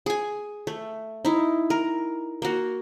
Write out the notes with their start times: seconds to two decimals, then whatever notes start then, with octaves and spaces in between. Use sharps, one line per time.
0.06 G#4 G#5
0.67 A3
1.25 D#4 E4
1.70 A#4
2.42 A#3 F#4